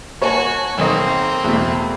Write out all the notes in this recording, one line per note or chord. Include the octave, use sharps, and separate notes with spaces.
A#3 F#4 C#5 G#5 A5
B1 D#3 A#3 C4 D#5
E2 B2 A3